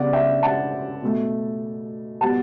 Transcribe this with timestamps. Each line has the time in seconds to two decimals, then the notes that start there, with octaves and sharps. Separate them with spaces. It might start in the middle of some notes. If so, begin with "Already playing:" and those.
Already playing: C#3 G3 B3 D5 F#5
0.13 E5 G5
0.43 F#5 A5
1.02 B2 A3
2.21 B2 G3 B3 F#5 A5